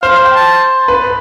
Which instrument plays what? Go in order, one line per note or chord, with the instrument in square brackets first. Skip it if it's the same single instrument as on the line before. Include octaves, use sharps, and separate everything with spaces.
[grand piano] C5 [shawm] F5
[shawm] F5
G5
A5
[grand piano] B4